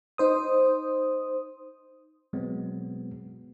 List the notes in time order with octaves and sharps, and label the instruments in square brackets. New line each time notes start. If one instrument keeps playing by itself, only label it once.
[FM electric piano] D#4 C5 D#6
[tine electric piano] B2 F#3 G#3 B3 C4